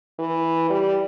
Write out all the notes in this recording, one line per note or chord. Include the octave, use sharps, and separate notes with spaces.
E3
G3